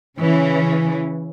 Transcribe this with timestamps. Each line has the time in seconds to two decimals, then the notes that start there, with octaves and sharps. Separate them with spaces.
0.18 C#3 E3 C#4